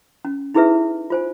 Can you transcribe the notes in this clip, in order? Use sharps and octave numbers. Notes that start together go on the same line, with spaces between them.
C#4
D#4 E4 G#4 A4 B4 E5
F4 C5 G#5